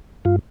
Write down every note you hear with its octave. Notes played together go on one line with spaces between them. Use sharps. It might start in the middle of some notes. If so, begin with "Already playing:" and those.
G2 F4